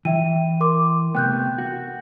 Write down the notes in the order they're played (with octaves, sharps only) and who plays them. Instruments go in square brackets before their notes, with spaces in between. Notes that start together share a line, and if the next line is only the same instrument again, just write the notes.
[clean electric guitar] E3 [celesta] E5 G5 D#7
[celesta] A#4 C6 D6
[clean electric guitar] C3 A3 B3 [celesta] G5 F#6 G6
[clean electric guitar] F#4